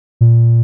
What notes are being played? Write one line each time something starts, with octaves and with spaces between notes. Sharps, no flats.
A#2